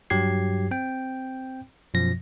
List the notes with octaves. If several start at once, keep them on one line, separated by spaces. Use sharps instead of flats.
G2 F#3 G4 G#6 C7
C4 G5
F#2 B2 F3 A#6